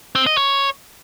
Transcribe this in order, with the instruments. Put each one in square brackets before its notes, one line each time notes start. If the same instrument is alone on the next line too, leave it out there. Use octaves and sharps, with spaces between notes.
[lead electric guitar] C4
D#5
C#5